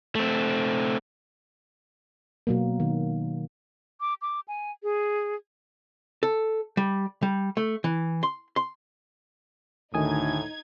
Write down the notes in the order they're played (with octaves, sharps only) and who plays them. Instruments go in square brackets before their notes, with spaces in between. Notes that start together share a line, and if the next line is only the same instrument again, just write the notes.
[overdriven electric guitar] A3 C4
[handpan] B2 F#3 A#3
D#3
[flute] D6
D6
G#5
G#4
[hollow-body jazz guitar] A4
G3
G3
A3
E3
C6
C6
[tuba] D2 [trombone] A2 [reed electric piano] D#3 G#5 D#6 [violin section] D#4 G#6